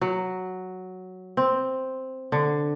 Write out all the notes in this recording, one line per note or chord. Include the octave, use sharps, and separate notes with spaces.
F#3
C4
D3